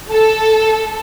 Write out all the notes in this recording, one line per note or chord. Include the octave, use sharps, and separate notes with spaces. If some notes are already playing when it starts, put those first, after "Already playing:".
A4